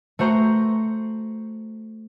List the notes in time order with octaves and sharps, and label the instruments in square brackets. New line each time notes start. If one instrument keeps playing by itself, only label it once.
[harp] A3 F#4 C5 A#5